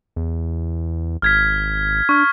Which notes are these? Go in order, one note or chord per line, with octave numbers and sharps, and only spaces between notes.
E2
G#1 F6 G#6 B6
D4 C#6 F6